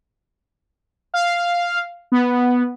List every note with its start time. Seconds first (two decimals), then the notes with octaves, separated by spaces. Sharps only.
1.14 F5
2.12 B3